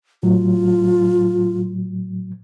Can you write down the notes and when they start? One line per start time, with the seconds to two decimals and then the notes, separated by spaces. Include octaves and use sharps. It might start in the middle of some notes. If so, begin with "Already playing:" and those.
0.23 A2 F#3 F4